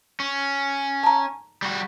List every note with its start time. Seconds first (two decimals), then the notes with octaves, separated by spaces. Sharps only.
0.20 C#4
1.03 A5 A#5
1.62 G3 F#4